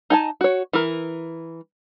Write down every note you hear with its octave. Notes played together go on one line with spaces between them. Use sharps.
D#4 G#5 A5
F#4 C#5
E3 A#4